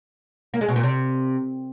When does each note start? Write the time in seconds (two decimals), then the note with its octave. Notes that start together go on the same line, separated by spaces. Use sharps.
0.54 A#3
0.61 G#3
0.68 B2
0.76 A#2
0.83 C3